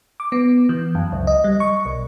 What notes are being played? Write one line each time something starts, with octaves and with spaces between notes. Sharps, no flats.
D6
B3
E3
F#2
C#2
D#5
G3
C#6
B1